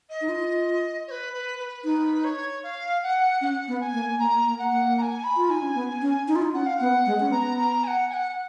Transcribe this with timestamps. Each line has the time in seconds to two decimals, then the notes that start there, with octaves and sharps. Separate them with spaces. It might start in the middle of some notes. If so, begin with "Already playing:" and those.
0.09 D#5
0.21 D#4
0.29 F4
1.07 C#5
1.11 B4
1.33 B4
1.59 B4
1.85 D#4 B4
2.14 B4
2.24 C#5
2.63 F5
3.03 F#5
3.41 C#4 F#5
3.68 B3
3.80 G#5
3.93 A#3
4.19 A#3 A#5
4.46 A#3
4.58 F#5
4.71 A#3
4.98 A#5
5.02 G#5
5.24 B5
5.37 F4
5.50 D#4 G#5
5.62 C#4
5.75 B3
6.02 C#4
6.28 D#4
6.36 F4
6.42 D#4
6.54 C#4 F#5
6.66 F5
6.78 B3 F#5
7.06 G#3
7.20 C#4
7.31 B3 A#5
7.58 A#5
7.84 G#5
7.87 F#5
8.10 G#5
8.13 F#5